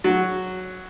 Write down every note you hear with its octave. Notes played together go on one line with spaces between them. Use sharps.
F#3